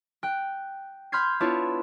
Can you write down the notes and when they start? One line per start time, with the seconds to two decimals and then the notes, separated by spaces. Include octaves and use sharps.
0.23 G5 F#6
1.12 B5 C6 F6 G6 G#6 C7
1.40 B3 D4 E4 F4 C#5